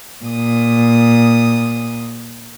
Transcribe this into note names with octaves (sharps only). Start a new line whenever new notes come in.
A#2 D#6